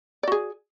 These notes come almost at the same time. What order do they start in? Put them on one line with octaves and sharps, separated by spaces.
D5 F#4 G#4